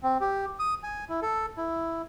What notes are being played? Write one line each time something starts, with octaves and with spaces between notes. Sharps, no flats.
C4
G4
D#6
G#5
E4
A4
E4